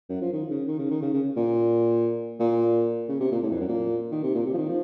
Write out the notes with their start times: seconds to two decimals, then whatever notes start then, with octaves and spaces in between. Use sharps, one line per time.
0.09 F#2
0.21 F3
0.32 D#3
0.50 C#3
0.67 D#3
0.78 C#3
0.90 D#3
1.02 C#3
1.13 C#3
1.36 A#2
2.39 A#2
3.09 C#3
3.20 C3
3.31 A#2
3.43 A2
3.51 F2
3.60 F#2
3.68 A#2
4.11 D#3
4.23 C3
4.35 A#2
4.46 C3
4.53 F3
4.57 D#3
4.68 F3